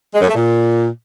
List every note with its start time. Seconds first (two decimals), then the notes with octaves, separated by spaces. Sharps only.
0.14 G#3
0.21 F#2
0.28 A3
0.35 A#2